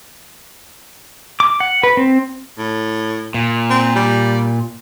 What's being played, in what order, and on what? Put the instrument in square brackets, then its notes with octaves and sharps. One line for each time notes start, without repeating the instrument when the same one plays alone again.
[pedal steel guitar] D6
F#5
B4
C4
[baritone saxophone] A2
[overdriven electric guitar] A#2
[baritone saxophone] C4
G3